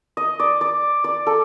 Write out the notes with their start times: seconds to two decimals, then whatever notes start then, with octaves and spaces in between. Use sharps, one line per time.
0.17 D#5
0.40 D5
0.61 D5
1.04 D5
1.27 A4